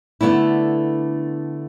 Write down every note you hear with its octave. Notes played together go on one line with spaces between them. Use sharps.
D3 A3 B3 D4 E4